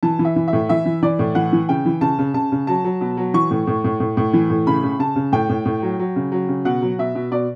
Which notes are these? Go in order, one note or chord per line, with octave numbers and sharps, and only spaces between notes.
E3 A5
E3
E5
E3
E5
A2
E3 E5
E3
E3 D5
A2
E3 F#5
E3
C#3 G5
E3
C#3 A5
C#3
C#3 A5
C#3
F#3 A5
F#3
B2
F#3
E3 C#6
A2
A2
A2
A2
A2
E3
A2
C#3 B5
C#3
C#3 A5
C#3
A2 G5
A2
A2
F#3
F#3
C#3
F#3
C#3
B2 F#5
F#3
B2 E5
B2
B2 D5